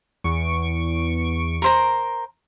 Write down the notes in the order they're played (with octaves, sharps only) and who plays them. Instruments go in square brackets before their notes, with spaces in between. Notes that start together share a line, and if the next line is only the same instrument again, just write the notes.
[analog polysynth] E2 C#6 D7
[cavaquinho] A#4 C5 A#5